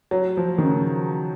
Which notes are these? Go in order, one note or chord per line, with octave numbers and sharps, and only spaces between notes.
F#3
F3
D#3
C#3